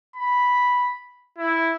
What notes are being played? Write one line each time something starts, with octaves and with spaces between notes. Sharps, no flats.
B5
E4